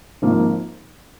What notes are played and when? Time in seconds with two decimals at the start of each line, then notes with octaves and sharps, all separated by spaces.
0.22 G#1 G#2 F3 A#3